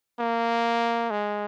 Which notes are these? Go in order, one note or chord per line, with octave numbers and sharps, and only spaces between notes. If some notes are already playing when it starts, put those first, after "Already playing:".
A#3
G#3